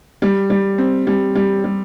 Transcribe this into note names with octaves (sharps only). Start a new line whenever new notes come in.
G3
G3
C4
G3
G3
G3